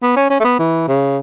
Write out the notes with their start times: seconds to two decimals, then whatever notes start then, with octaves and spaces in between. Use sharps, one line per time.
0.02 B3
0.16 C#4
0.30 C#4
0.40 A3
0.44 B3
0.59 E3
0.88 C#3